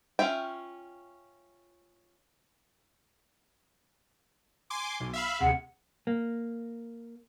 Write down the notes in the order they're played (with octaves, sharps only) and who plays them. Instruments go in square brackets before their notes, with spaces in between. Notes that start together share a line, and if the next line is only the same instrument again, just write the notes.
[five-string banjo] C#4 F4 E5 G5
[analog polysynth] G#5 C6 D6
B1
E5 F5 B5
[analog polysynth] D2 C3 [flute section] G#4 F#5
[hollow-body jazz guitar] A#3